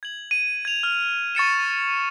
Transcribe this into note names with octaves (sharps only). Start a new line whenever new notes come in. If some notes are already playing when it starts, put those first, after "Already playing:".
G#6 F#7
D#7
G#6 F7
F6
C#6 A6 C#7 E7